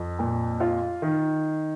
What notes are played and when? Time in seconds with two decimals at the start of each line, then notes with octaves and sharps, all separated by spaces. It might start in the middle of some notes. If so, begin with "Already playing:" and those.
Already playing: F2
0.19 A#2
0.60 F4
1.02 D#3